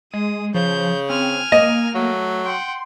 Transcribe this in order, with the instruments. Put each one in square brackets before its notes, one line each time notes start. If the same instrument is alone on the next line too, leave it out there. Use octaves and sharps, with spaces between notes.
[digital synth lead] G#3 [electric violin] D#6
[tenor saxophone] C#3 [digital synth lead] F3 [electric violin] G6
[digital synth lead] C4 [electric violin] G#5 F6
[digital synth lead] A#3 [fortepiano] D#5
[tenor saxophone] F#3 [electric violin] A3
[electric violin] F#5 G5 [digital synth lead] C6